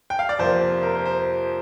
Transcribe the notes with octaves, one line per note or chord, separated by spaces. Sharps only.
G5
F5
D5
F2 C3 A#3 C5
A#4
C5
C5